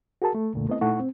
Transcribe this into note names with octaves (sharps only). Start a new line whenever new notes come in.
F#4 G#4 A#4 A5
A3
C2 F2 A#2 D3 A3
A3 B3 C4 E4 D#5
A#2 A3 D#4 E4 F#5 C#6
C4